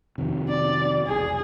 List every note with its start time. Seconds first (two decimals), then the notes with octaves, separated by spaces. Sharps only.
0.18 F2 C3 D#3
0.48 D5
1.07 E1 B1 G#4